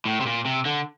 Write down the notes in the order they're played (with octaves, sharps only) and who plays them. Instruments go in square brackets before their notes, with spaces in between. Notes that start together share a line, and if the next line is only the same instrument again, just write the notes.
[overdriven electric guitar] A2
C3
A#2
C3
D3